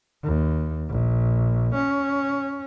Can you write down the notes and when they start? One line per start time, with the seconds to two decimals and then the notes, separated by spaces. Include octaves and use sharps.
0.23 D#2
0.89 A#1
1.74 C#4